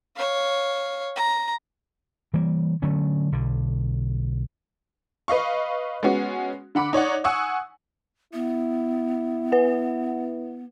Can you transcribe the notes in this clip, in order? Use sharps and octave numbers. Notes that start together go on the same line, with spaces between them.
C#5 F5
A#5
E3 G3 A#3
D3 F#3 A3 C#4
B1 D3
B4 D#5 F5 C#6
G#3 B3 C#4 F#4
D3 F#5 B5 D6
D#4 C#5 D5 F#5
F#5 G#5 C#6 D#6 E6
B3 E4
B4 F#5